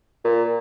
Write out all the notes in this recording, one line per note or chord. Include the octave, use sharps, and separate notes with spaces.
A#2